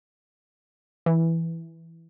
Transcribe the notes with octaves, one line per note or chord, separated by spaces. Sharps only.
E3